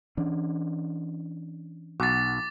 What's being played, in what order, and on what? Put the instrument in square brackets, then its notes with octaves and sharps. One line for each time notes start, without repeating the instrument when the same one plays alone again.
[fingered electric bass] E3 C#4 D4
[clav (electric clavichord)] B1 F#4 [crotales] D6 A6